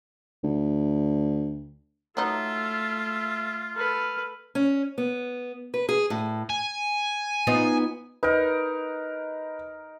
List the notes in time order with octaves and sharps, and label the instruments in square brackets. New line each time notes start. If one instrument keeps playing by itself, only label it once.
[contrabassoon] D2
[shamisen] F#3 D#4 [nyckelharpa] A3 E5 [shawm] F4
[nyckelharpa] A4 B4 [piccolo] F6
[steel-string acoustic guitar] C#4
B3
B4
G#4
A2
[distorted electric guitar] G#5
[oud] B3 D#4 F4
[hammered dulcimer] D#4 A#4 [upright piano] B4